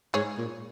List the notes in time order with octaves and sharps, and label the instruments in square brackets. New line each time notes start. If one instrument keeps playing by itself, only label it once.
[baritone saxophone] G#2 [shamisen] G#4 C#5
[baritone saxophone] A#2